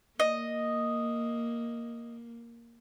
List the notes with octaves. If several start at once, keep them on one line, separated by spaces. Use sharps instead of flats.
A#3 D#5